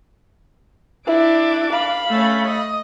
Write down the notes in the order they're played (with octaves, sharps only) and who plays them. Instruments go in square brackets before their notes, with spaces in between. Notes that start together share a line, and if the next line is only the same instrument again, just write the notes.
[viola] D4 D6 [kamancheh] E4
[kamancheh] F5 B5
[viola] A3 C#4
D#5